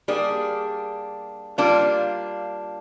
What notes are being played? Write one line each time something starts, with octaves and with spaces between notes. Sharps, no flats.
G3 A#3 D4 G#4
G3 A#3 D4 F4